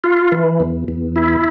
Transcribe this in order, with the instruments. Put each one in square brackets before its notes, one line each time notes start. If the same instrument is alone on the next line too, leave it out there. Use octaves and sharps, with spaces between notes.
[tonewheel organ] F4
E3
E2
E2
E4